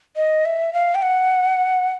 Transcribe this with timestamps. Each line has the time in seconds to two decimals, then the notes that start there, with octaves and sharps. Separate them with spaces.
0.16 D#5
0.45 E5
0.73 F5
0.95 G5
1.02 F#5